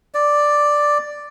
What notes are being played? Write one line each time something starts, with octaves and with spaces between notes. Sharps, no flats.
D5